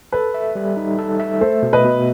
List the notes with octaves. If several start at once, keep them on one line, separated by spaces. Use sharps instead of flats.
A4 B4
E5
G3
D#4
A4
E5
A3 A4 C5
B2
B4 D#5
B2